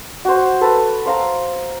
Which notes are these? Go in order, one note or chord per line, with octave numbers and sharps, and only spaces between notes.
F#4 C5
A4 B4
C5 F5 A#5